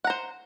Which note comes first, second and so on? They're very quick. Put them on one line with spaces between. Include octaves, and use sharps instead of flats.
F#5 A#5 C5